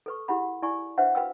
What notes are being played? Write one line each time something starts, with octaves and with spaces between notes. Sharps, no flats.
A4 B4 C#6
E4 G4 G#4 F#5 B5
E4 D5 G#5 C#6
D4 B4 C5 E5 F#5
F#4 B4 F5 G5 E6